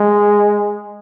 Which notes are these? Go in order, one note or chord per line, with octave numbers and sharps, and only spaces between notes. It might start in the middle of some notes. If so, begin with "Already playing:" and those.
Already playing: G#3